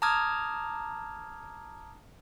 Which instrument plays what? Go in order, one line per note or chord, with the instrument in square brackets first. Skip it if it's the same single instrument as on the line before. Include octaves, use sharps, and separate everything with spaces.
[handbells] A5 A#5 D6 D#6 F6 G#6